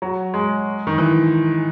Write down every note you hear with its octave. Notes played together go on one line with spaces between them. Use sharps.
F#3
G#3
D#3
E3